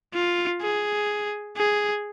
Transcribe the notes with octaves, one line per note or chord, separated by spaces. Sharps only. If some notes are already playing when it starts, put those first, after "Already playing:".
F4
G#4
G#4